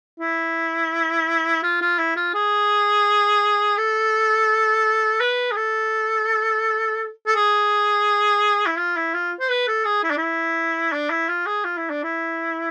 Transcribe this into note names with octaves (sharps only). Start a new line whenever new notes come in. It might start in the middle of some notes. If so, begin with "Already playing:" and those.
E4
F4
F4
E4
F4
G#4
A4
B4
G#4
A4
A4
G#4
E4
F4
E4
F4
C5
B4
A4
G#4
E4
D4
E4
D4
E4
F4
G#4
F4
E4
D4
E4